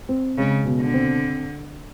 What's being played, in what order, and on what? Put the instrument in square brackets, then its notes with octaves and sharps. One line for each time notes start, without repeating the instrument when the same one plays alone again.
[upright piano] C4
[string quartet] C#3 [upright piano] G#3
[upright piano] B2
[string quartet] D3
[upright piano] C4